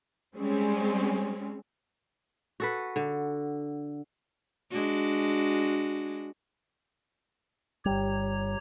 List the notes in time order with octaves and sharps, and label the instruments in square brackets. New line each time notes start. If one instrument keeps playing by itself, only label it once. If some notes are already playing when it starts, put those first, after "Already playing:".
[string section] G3 G#3 C4 C#4
[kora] F#4 A4 B4
D3
[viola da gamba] G#3 D4 F#4
[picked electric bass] G1 G3 [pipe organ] G4 C#5 A#5